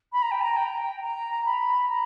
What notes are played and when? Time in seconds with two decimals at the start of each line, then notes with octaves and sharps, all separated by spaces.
0.13 B5
0.22 A#5
0.31 G5
0.41 A#5
0.57 G5
1.01 A#5
1.45 B5
1.90 A#5